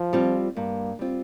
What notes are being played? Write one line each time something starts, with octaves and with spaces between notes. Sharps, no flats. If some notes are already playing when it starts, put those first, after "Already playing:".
Already playing: F3
G3 C4 F4
G2 A#3
G3 C4 F4